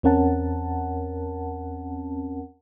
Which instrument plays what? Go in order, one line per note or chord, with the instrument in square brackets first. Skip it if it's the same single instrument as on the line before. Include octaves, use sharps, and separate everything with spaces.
[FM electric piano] E2 C4 C#4 A#4 F#5 A5